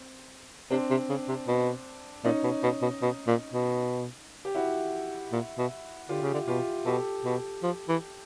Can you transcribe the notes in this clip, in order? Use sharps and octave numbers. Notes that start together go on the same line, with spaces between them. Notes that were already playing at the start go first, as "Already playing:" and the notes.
Already playing: C4
C3 C4 D4
C3
C#3
C3
B2
A#2 C#4 D#4
B2
B2
B2
B2
A#2
B2
G4
E4 F#4
A#2
B2
D3 F4 G4
C#3
D3
B2 F4 G4
B2 G4 A4
B2
F3
E3